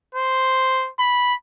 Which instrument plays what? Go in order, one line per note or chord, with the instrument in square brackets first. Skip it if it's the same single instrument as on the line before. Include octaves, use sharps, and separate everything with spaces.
[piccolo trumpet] C5
B5